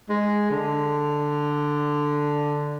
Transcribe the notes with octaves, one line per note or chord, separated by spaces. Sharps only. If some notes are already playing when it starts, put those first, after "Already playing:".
G#3
D3